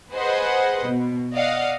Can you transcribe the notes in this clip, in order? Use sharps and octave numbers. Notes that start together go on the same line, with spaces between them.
G#4 B4 C5 D#5 F#5
B2
D5 D#5 F5 F#5